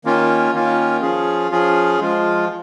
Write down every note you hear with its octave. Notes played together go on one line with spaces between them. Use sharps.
D#3 A#3 C#4 F4
D#3 A#3 C#4 F4
F3 C#4 F4 G#4
F3 C#4 F4 G#4
F3 G#3 F4